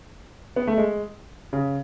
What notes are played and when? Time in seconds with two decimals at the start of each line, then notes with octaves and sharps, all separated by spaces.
0.56 B3
0.67 A3
0.78 G#3
1.53 C#3